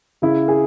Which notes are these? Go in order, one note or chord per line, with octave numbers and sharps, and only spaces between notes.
C#3 E4
G#4